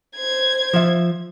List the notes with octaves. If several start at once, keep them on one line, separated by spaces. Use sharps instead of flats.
C5 G#6
F3 E5